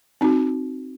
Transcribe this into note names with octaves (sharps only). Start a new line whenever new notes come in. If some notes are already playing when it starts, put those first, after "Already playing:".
C4 D#4 F#4